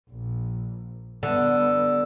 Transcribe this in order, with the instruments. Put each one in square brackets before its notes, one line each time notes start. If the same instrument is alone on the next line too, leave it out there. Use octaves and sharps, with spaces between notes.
[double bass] A#1
[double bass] G2 B3 [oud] D3